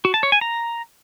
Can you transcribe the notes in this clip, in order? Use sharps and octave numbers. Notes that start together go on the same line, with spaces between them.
F#4
A5
C#5
G#5
A#5